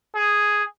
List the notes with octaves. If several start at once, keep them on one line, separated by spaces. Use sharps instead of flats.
G#4